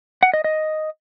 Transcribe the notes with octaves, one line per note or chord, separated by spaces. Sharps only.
F#5
D#5
D#5